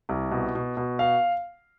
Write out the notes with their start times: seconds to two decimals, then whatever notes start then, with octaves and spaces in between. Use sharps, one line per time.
0.09 C2
0.31 B2
0.55 B2
0.77 B2
0.99 F5